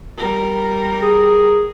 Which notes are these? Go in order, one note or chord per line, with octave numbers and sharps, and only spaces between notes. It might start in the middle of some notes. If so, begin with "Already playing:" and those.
G3 A#4
G#4